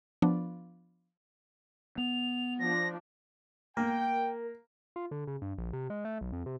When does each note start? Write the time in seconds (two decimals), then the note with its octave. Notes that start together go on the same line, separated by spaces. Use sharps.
0.22 F3 B3 D4
1.98 B3 F7
2.59 F3 D4 A#6
3.77 A#3 A#4 G5
4.96 F4
5.11 D3
5.27 C#3
5.42 G2
5.58 A#1
5.73 C3
5.90 G#3
6.05 A3
6.21 B1
6.33 F2
6.46 C3